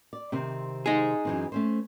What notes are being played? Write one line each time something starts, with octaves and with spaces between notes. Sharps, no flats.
D5
C3 D#3 C4
D#4 G#4
F#2 E3 C4
A3 C#4 C5